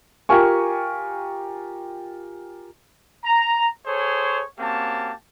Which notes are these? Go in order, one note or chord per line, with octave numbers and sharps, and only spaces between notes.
F4 G4 A#4 G#5 C#6
A#5
G#4 A4 C5 C#5
A#3 C4 C#4 F#4 G4 A5